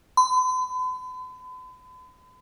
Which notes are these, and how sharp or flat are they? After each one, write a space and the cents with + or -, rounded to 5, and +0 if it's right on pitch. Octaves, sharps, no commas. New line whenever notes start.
B5 +45